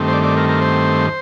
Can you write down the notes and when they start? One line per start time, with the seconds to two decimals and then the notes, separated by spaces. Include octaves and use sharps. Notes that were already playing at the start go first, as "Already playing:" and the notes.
Already playing: G2 D#3 A3 C4
0.08 C5
0.13 D5
0.24 D5
0.37 A#4
0.49 A#4
0.61 C5